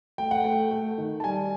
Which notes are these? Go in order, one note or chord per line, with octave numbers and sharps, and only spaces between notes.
A3 G5
F#5
A3 G5
A3
D#3
A5
G3 G#5